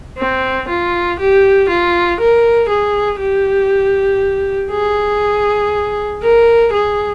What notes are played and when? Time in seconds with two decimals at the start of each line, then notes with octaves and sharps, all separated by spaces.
0.18 C4
0.69 F4
1.19 G4
1.69 F4
2.20 A#4
2.69 G#4
3.20 G4
4.71 G#4
6.22 A#4
6.73 G#4